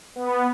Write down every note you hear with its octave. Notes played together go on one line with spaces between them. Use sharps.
B3